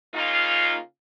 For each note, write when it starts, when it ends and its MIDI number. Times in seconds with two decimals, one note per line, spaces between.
0.14 0.77 49
0.14 0.77 58
0.14 0.77 63
0.14 0.77 65